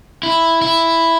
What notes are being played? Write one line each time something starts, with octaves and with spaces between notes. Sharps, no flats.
E4
E4